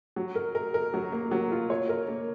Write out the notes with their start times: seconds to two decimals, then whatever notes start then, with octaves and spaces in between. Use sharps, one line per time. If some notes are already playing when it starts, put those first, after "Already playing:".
0.16 F#3
0.36 A#4
0.55 A#4
0.74 A#4
0.94 F#3
1.12 A#3
1.31 F#3
1.52 F4
1.70 C#5
1.89 A#4
2.08 A#3